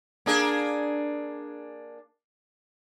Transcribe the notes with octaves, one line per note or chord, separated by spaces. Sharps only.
A#3 D4 G#4